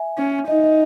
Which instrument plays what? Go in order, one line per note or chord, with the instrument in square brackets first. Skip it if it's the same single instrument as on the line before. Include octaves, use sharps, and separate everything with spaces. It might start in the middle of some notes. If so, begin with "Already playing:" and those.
Already playing: [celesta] E5 G#5
[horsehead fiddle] C#4
[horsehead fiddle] D#4 [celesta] D#5
[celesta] D#5